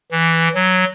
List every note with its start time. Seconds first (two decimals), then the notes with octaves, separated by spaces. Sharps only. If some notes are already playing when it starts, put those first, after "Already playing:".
0.11 E3
0.55 F#3